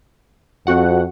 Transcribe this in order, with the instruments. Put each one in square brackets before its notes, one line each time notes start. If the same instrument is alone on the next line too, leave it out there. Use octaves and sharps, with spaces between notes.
[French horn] F2 [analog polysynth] C4 F#4 F#5